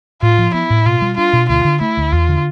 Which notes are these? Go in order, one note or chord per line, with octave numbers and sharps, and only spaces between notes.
A2 F4
F3
B3 E4
A2
B2 F4
G3
D4 F4
B2
D2 F4
D3
A3 E4
D2
E2 F4
D3